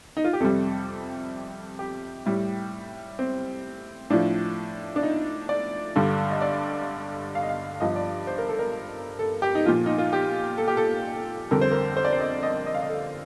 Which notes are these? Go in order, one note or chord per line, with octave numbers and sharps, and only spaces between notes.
D#4
F4
G4
F2 C3 G3 A4
G4
A2 G3
C4
A2 F3 D4
D4
D#4
D5
G2 D3 G3
D#5
D5
F5
D#5
F5
G2 F3 D#5
D5
C5
A#4
A4
A#4
A4
G4
D#4
A#2 F3 F4
D#4
F4
G4
A4
G4
A4
F2 D3 G3 A#4
C5
A#4
C5
D5
C5
D#5
D#5
D#5
F5
D#5
A4